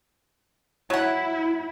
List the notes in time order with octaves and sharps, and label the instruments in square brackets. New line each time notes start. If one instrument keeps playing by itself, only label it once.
[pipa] F#3 F#5 [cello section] E4